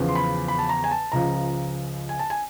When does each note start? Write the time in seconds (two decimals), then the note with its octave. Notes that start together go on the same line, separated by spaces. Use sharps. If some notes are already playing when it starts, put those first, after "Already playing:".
Already playing: E2 C#3 F3
0.08 C6
0.15 B5
0.48 B5
0.58 A5
0.69 A#5
0.84 G#5
0.91 A5
1.12 C#2 C#3 F3 A#5
2.09 G#5
2.19 A5
2.30 G#5